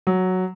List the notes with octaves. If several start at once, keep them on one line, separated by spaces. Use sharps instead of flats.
F#3